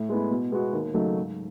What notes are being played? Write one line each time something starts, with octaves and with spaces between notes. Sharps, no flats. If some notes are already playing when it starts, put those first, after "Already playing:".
Already playing: A2
G#3 B3 E4
B2
G#3 B3 F#4
D#2
C#3 F#3 A3 D#4
G#2